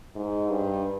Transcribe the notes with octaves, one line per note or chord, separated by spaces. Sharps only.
G#2
G2